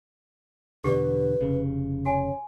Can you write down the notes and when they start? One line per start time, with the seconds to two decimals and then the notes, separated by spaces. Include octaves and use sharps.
0.84 E2 B2 D3 G4 B4 D5
1.41 F1 C#3
2.05 F#4 C#5 G#5